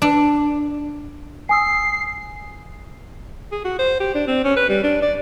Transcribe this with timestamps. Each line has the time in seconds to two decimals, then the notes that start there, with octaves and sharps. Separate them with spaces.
0.02 D4
1.49 G#5 D#6 E6 C7
3.52 G#4
3.64 F#4
3.79 C5
4.00 G4
4.15 D4
4.27 C4
4.44 C#4
4.57 B4
4.69 G3
4.83 D4
5.02 D5